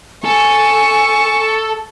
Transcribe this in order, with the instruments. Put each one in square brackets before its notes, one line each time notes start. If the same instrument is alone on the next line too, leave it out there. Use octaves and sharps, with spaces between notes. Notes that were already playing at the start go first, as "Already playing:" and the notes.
[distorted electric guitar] A4 [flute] G#5 [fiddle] C#6